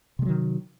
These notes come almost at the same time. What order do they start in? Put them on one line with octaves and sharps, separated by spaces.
C3 G#3 F#3 D#3